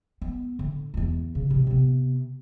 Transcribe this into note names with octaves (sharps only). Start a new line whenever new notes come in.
B3
D3
E2 B3
C#3
A2 C3
C3 B3